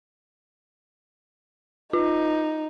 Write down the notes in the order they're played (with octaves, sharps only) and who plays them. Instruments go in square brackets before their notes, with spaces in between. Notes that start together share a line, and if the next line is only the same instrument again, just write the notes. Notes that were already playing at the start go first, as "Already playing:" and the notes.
[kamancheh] D#4 [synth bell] F4